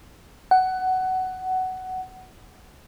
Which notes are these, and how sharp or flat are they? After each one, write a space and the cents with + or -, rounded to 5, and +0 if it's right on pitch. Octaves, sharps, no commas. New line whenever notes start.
F#5 +15